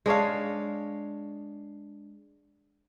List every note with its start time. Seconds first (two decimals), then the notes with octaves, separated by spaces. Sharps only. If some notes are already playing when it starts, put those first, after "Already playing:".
0.06 G#3 D4 C#5 F5